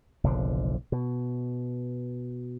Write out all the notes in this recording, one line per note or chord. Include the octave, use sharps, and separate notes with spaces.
F#1 B1 D3 F3
B2